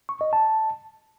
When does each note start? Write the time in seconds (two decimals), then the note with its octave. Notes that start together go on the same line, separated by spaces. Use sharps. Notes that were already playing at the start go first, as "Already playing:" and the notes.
0.09 C#6
0.21 D#5
0.33 A5